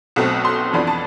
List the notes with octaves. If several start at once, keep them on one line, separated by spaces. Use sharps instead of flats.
B1 B2 A3 C4
C6
F2 E3 B3 D4 B5
A5